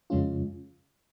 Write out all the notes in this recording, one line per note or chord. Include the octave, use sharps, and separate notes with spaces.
F2 C#3 G#3 C#4 F4